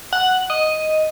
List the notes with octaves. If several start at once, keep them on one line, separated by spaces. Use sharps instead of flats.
F#5
D#5